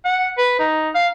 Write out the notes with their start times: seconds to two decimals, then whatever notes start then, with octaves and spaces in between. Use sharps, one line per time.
0.05 F#5
0.38 B4
0.59 D#4
0.95 F5